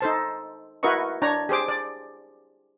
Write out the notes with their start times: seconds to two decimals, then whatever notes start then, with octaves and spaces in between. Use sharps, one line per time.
0.01 D#4 A4 C5 A5
0.83 E4 F#4 A#4 B4 D#5 C#6
1.22 D4 C#5 A#5
1.49 G4 G#4 C5 D6
1.68 D5